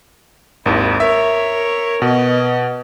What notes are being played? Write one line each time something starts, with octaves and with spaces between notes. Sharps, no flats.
G#1 D#2 E4
A#4 C#5 E5
B2 B3 D#5